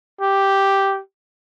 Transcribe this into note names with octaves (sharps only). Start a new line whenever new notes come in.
G4